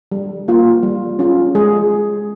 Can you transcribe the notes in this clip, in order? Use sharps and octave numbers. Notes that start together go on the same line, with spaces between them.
G3
A#3 F4
G3
C#4 F4
G#3 G#4